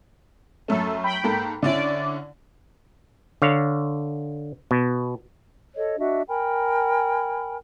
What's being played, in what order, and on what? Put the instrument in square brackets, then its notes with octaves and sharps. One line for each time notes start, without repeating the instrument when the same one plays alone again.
[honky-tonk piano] F#2 A3 C#4 [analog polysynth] A4
[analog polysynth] G5 B5
[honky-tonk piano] G#2 A#3 A4
[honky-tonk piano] D3 C#4 E4 [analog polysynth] D5
[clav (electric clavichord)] D3 C#5 F5
B2
[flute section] A4 C#5 D#5
D4 F#4 D#5 E5
A#4 G5 G#5 B5